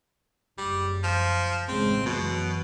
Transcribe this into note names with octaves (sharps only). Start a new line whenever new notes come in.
F#1 G3
F3
A1 C#3 G#3 C4
F#2 B2 E3 F#3